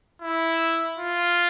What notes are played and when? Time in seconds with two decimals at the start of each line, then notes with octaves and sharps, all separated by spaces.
0.22 E4
0.98 F4